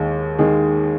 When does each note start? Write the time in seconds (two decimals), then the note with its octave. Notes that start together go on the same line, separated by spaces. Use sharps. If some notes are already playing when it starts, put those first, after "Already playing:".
Already playing: D#2 D#3 G#3
0.39 D#3 G#3